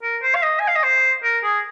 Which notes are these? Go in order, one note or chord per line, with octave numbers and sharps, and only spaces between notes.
A#4
C5
F5
D#5
G#5
F5
D#5
C5
A#4
G#4